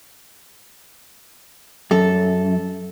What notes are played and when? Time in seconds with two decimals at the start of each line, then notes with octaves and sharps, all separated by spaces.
1.91 F#2 A4